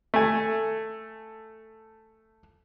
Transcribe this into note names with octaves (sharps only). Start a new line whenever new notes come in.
A3 G#5